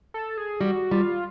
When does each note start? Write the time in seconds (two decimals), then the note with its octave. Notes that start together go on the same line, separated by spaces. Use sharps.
0.14 A4
0.38 G#4
0.60 G3 F#4
0.91 G3 F4